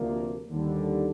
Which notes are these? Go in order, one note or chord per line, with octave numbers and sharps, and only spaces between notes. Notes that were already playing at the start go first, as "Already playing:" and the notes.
Already playing: D2 C3 F3 A#3
D#2 D3 G3